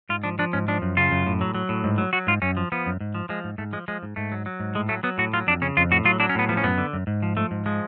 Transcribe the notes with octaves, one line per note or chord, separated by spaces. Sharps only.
G#2 F4
F3 D4
F3 D4
G#2 C#4
F3 D4
F#2
C#3 F4
F#2
A2
F#3
F#3
A2
G#2
F#3
F#3 F#4
G#2 F4
F#2 C#4
F3
F3 B3
F#2
G#2
F3
F3 G#3
G#2
G#2 A3
F3 G#3
F3 G#3
G#2
G#2 A3
F#3
F#3
G#2
A2 G#3
F#3 A3
F#3 B3
A2 F#4
F#3 F4
F2 D4
C#3 C#4
F2 F4
A2 F#4
F#3 F4
F#3 D4
C#4
A2 B3
F3 B3
C#4
F#2 B3
D3
F#2
G#2
F3
F3 A3
G#2
F3 G#3